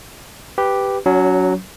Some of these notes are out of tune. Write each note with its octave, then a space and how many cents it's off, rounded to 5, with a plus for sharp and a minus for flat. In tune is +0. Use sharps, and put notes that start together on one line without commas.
G4 +0 B4 +5
F#3 +0 C#4 +35